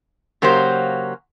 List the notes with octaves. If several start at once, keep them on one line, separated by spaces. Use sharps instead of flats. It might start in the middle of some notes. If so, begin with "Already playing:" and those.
C#3 F#3 A#3 F#4 G4 C5